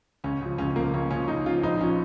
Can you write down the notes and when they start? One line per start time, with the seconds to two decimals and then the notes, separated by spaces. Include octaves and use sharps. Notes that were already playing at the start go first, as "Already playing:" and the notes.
0.24 C#2 C#4
0.41 C#3 F3
0.58 C#2 C#4
0.71 C#4
0.75 C#3 F3 A#3
0.93 C#2 C#4
1.11 C#3 F3 C#4
1.28 C#2 D#4
1.46 C#3 F3 F4
1.63 A#1 D#4
1.81 A#2 F3 C#4